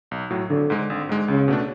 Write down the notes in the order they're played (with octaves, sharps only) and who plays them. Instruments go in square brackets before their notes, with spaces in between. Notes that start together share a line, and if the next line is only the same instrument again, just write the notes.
[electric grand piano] B1
A2 F#3
[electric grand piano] G#1 [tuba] D3
[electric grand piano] G#2 G#3
G#1
G#2 G#3
[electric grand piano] C#2 [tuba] C#3
[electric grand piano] B2 A3 D4